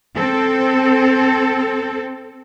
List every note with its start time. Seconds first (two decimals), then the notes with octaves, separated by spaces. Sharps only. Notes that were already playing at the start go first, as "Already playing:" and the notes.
0.15 C4 A4